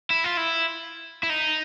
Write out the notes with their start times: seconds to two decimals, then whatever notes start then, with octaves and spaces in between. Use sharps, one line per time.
0.10 E4
0.24 F4
0.37 E4
1.23 E4
1.30 D#4